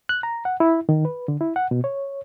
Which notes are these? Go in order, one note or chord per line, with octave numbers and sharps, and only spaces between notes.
F#6
A#5
F#5
E4
D#3
B4
D3
E4
F#5
B2
C#5